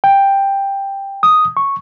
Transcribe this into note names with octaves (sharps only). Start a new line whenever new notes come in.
G5
D#6
C#6